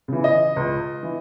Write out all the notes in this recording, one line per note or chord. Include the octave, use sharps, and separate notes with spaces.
C#3 E3
D#5
C#2
E3